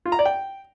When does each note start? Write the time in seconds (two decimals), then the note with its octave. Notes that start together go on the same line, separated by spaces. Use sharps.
0.06 F4
0.12 A#5
0.19 D5
0.25 G5